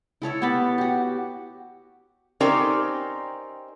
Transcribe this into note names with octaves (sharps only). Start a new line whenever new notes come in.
E4 A4 C#5 E5
B3 G4 A5 B5
F#4 G4
C4 C#4 D#4 G4 A#4 D5